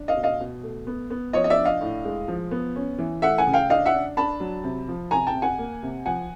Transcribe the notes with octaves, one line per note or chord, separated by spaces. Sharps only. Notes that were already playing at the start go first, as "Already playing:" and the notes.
Already playing: D4
D#5 F5
B2
D#5 F5
B2
A3
B3
B3
F3 C#5 D#5
D#5
D5 E5
D4
D#5 F5
A2
G#3
F3
B3
C#4
E3
A3 E5 F#5
F#5 G#5
C#3
F5 G5
D4 D#5 F5
E5 F#5
D4
D4 A5 B5
F#3
C3
F3
C3 G#5 A#5
G5 A5
C3
F#5 G#5
A#3
C3
F3 F#5 G#5